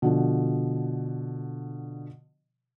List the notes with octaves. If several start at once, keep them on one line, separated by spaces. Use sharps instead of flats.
B2 D3 F3